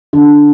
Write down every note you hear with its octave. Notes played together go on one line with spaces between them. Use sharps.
D3